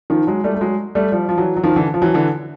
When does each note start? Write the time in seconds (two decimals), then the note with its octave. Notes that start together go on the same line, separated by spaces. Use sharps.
0.10 D#3 F3
0.27 F#3 G#3
0.44 G3 A3
0.54 A3
0.61 F#3 G#3
0.95 G3 A3
1.12 F3 G3
1.29 F3
1.37 E3 F#3
1.57 F#3
1.63 D#3 F3
1.76 D3 E3
1.94 F3
2.02 E3 F#3
2.14 D3 E3